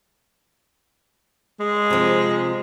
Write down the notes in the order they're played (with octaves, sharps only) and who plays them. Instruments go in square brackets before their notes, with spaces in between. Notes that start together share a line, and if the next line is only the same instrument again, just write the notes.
[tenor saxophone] G#3
[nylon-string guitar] C3 F3